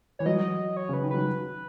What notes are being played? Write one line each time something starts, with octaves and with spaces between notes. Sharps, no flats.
E3 C#5
F#3 D#5
C#5
C#3 B4
D#3
F#3 B4